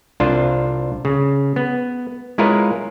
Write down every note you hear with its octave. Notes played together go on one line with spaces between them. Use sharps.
C2 D4 F4 C5
C#3
B3
G#3 E4 F4 A#4 B4 C#5